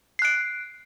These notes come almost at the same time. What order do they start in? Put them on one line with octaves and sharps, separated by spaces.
C7 F#6 D7